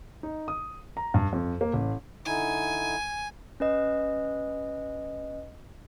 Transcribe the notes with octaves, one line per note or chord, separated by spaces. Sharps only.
D#4
D#6
A#5
G2
F2
A#3
A1
D3 D#4 E4 G#5
C#4 B4 D#5